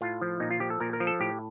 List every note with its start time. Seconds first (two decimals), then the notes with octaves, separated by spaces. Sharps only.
0.01 A2 F4
0.21 F3
0.40 A#2 D#4
0.51 F4
0.60 F3 G4
0.70 A4
0.80 A#2 A#4
0.93 A#4
1.00 F3
1.07 A4
1.20 A2 G4